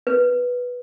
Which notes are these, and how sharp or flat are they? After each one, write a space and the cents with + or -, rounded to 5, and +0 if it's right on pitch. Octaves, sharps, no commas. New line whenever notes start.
B4 -5